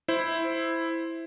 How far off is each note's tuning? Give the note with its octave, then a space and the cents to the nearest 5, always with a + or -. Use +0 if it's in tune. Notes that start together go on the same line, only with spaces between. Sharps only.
E4 +0 C5 +0